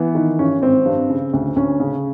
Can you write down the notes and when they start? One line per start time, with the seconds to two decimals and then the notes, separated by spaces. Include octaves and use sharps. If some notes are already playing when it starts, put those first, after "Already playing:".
Already playing: E3 B3
0.15 D#3
0.39 G2 C#4
0.61 G#1 C4
0.85 G2
1.10 C#3
1.33 D2
1.56 D2 C#4
1.80 C#3